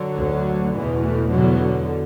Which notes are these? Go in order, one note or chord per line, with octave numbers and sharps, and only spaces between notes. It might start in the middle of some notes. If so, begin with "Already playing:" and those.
Already playing: D3 F#3
D2
E2 B2 E3
E3 A3
E2 B2 D3 F#3
D3